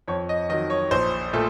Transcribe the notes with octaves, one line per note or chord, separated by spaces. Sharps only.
F2 C#5
D#5
D#3 F#3 D#5
C#5
A#1 C5
A#2 A3 A4